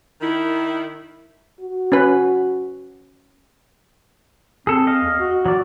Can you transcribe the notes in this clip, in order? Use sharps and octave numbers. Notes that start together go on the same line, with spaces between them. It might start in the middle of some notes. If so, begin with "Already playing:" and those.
D#3 E4
F#4
C#4 B4
C4 G#4 A4
D#5 F5
E2
F#4
F#3 D5